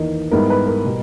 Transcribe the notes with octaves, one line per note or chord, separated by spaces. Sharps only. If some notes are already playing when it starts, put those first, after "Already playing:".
Already playing: E2 D#3 A#3 D#4
G#2 G3 B3 E4 A#4
B4
A#4
B2 G3